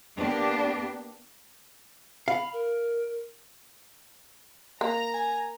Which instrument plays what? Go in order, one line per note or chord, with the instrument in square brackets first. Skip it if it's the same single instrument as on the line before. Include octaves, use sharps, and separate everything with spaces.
[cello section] A#3 B3 D4 G4
[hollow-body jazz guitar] F5 [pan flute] B5
[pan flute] A#4
[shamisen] A#3 [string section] A#5
[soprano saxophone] G#5